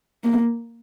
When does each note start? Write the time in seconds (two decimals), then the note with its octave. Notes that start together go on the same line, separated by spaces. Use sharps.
0.24 A#3